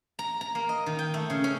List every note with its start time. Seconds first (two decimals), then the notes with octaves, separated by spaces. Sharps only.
0.19 A#5
0.41 A#5
0.55 A#3
0.69 D#5
0.86 D#3
0.99 G5
1.14 A3
1.30 C#3
1.44 C#4